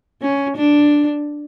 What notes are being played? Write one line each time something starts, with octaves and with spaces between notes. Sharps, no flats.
C#4
D4